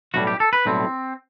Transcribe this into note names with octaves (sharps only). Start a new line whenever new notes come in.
B1 A2 G3 F#4
G4
A4
B4
B1 A2 G3 C4